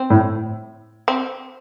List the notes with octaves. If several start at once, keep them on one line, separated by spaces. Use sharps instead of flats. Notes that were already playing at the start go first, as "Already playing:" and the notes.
Already playing: C4
A2
C4